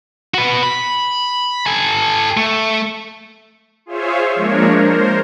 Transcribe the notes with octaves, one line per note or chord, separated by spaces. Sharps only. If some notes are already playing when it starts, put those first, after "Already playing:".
F#4 B4
B5
A4 G#5
A3
F4 G#4 C5 C#5 E5 F5
F3 G#3 A#3 D4 A#4 C#5
A#4 C5